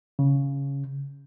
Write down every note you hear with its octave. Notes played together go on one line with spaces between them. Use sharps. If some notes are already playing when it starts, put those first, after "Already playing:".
C#3